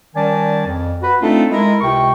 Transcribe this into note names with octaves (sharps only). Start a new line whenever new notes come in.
D#3 G3 C#4 D5 G#5 A5
F2
F#4 B4
A3 C4 D4 D#4 F4 A4
G#3 E4 A#4
C#2 C3 G5 C#6